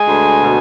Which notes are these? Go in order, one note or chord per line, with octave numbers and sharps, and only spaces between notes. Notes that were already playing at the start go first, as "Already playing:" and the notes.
Already playing: G#3 G#5
D2
B2